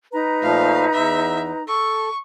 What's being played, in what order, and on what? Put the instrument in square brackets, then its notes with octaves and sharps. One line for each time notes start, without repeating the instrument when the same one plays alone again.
[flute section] D#4 B4 A#5
[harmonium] A#2 F3 A3 [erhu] F5
[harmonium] E2 [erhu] E5
[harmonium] A4 [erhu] C#6